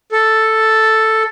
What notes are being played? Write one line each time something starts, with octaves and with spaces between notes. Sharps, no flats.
A4